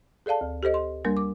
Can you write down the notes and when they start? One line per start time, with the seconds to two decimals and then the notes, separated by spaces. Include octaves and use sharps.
0.26 G#4 A4 D5 F5 A5
0.41 D2
0.63 G4 A4 C5 D#5
0.74 C6
1.05 G3 A#3 D4 A#4
1.17 D6